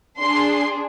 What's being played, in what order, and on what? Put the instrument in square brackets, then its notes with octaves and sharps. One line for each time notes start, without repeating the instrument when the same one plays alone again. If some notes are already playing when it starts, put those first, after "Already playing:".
[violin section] D4 G#4 C6